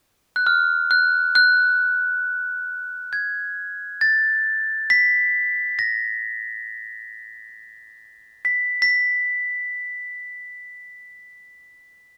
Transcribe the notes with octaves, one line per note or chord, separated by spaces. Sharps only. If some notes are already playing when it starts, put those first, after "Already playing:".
F#6
F6
F#6
F#6
G#6
A6
B6
A#6
B6
B6